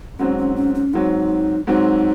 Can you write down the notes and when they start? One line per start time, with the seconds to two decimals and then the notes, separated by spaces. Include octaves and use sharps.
0.19 G#2 F#3 C4 C#4
0.38 C#4
0.56 C#4
0.75 C#4
0.93 G#2 F#3 C4 D#4 E4
1.67 G#2 F#3 C4 D#4